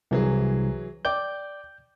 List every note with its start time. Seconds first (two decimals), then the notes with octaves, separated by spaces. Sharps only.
0.11 C2 E3 F#3 G#4
1.05 D5 G5 D6 G6